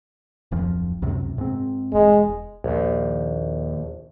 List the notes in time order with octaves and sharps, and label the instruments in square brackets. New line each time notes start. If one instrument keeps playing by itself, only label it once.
[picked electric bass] D1 F2 F3
C#2 F#2 C3
G#2 C4
[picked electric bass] E1 [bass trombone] G#3
[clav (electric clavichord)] A#1 [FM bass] D#2